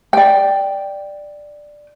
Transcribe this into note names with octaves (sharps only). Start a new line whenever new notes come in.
D5 G5